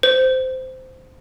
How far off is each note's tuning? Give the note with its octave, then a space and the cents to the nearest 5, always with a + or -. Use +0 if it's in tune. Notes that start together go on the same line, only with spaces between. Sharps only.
C5 -15